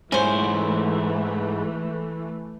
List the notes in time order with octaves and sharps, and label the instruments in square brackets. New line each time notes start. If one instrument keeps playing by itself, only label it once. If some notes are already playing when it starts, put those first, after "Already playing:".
[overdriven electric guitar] G#2 E4 [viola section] E3 A3 [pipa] C#4 C5